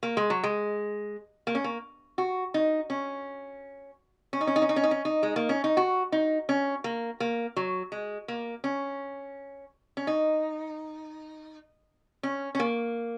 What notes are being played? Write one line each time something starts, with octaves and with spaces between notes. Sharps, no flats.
A#3
G#3
F#3
G#3
A#3
C#4
A#3
F#4
D#4
C#4
C#4
D#4
C#4
D#4
C#4
D#4
C#4
D#4
C#4
D#4
G#3
A#3
C#4
D#4
F#4
D#4
C#4
A#3
A#3
F#3
G#3
A#3
C#4
C#4
D#4
C#4
C#4
A#3